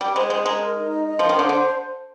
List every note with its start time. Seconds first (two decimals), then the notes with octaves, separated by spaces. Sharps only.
0.01 G3 G5
0.16 G#3 C5
0.30 G#3 C5
0.46 G#3 A#5
0.60 A#4
0.75 D#4
0.90 D#5
1.05 D#5
1.19 F3 C6
1.29 D#3
1.34 D3 C5
1.49 D3 C5